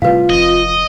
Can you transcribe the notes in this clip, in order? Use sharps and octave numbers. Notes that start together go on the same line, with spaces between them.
A2 C3 G3 F4 B4 F5
F1 F2 D#5